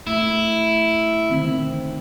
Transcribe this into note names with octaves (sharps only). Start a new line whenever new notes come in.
A3 E4
D3 D#3 C4
D#3